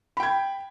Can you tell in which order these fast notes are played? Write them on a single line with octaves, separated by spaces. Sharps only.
B5 G5 G#6